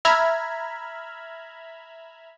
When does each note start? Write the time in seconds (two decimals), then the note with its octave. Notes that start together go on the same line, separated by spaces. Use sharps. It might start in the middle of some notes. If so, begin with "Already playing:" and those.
0.05 E5 A#5 B5 F6 G#6